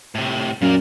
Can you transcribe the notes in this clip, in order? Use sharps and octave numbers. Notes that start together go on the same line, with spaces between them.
A2 C3
F#2 A#2 A#4